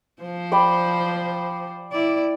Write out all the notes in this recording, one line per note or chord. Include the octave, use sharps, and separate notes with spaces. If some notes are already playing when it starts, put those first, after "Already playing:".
F3 C5
D5 G5 B5
E4 D5